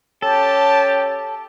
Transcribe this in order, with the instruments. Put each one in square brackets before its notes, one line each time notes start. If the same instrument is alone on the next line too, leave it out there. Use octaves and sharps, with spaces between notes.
[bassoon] C#4 [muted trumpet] G4 [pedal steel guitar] A4 [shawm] A5